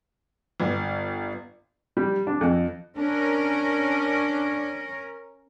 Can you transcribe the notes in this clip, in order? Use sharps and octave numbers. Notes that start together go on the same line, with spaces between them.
G1
G3
D4
F2
C#4 D4 A#4